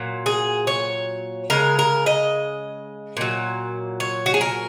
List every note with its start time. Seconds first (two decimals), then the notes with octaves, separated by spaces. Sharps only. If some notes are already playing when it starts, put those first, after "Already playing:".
Already playing: A#2 F#3
0.26 G#4
0.67 C#5
1.50 C#3 G#3 A#4
1.79 A#4
2.06 D#5
3.17 A#2 F#3
4.00 C#5
4.26 F#4
4.34 G#4
4.41 A#4